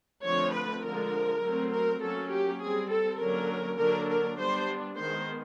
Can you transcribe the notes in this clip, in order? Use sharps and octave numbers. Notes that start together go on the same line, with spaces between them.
D3 F3 A3 C4 C#5
B4
D3 F3 G#3 A#4
F#3 A3 C4
A#4
F#3 A#3 C#4 A4
G4
G3 C4 G#4
A4
D3 F#3 A#3 C#4 A#4
D3 F#3 A#3 D4 A#4
A#4
G3 B3 D4 C5
D#3 G#3 B3 C5